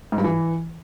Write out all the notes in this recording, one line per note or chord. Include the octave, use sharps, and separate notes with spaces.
G#2
G2
E3